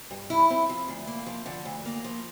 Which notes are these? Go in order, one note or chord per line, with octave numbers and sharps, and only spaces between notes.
G2
E4
C4
F3
D2
A#3
F3
D3
D2
A#3
F3